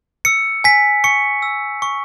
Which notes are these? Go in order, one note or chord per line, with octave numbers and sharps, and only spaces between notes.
E6 C#7
G#5 B6
C#6 C#7
E6
C#6